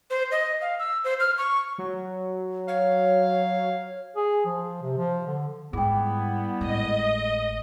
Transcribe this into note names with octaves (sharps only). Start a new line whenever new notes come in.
C5
D#5
F5
E6
C5
F6
C#6
F#3
C#5 F5
G#4
F3
C3
F3
D3
G#2 G3 B3 E4 G#4 G5
G#1 A2 D#5